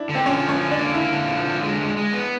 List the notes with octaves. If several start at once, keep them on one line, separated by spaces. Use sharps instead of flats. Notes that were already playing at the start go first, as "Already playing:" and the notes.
Already playing: D4 E4
D3
C4
F3 C#4
D3
C#4
D3
D4
A#3
A#3 E4
D3
F3
D3
G#3
G#3
G#3
B3